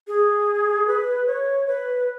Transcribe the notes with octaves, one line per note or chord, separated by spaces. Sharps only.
G#4
B4
C#5
B4